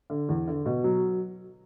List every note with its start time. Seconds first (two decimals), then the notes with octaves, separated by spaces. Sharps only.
0.10 D3
0.29 E2
0.48 D3
0.65 B2
0.84 F#3